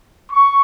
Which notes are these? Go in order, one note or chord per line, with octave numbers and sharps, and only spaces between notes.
C#6